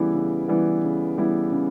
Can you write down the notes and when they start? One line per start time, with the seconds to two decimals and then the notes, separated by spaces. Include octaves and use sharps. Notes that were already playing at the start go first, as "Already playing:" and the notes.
Already playing: C#3 E3 G3 B3 E4
0.14 C#3
0.48 E3 G3 B3 E4
0.84 C#3
1.18 E3 G3 B3 E4
1.52 C#3